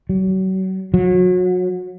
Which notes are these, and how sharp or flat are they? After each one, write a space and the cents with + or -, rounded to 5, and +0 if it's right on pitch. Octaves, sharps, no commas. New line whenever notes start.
F#3 +35
F#3 -30